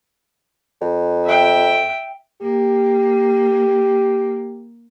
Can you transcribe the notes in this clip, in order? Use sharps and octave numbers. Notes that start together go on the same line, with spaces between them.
F2
E5 G5
A#3 G4